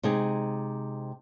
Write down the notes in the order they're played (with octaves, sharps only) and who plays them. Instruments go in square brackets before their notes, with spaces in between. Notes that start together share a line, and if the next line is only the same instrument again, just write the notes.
[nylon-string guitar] C3 G#3 D#4 G#4